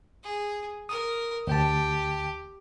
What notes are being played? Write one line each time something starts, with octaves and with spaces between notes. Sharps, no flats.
G#4
A#4 D#6
D2 G4 G5 A5